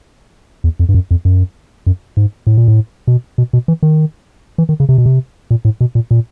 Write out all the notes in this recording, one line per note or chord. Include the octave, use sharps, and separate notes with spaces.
E2
F2
G2
F#2
F2
F#2
F#2
G#2
A2
A#2
A2
B2
B2
B2
E3
D#3
E3
D#3
C#3
C3
B2
C3
A#2
A2
B2
A#2
A#2